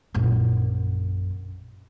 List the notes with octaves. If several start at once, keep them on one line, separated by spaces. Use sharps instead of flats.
A#1 F#2